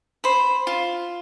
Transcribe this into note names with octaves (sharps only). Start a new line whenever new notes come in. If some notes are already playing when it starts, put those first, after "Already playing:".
C5 B5
F4